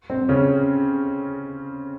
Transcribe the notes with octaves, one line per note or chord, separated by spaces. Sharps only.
C4
C#3 C#4